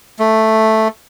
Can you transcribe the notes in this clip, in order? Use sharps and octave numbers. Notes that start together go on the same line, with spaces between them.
A3